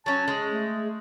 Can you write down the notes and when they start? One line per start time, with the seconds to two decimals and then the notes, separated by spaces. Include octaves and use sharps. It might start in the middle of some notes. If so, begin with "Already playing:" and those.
0.06 F#3 C#4 A5
0.28 G#3
0.50 A3